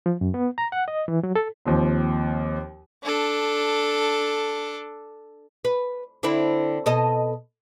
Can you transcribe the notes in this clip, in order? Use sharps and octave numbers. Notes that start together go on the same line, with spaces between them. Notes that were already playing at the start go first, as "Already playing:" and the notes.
F3
F#2
B3
A#5
F#5
D#5
E3
F#3
A4
D#2 F3 C4
D4 A4
B4
D3 C4 E4
B2 A4 D#5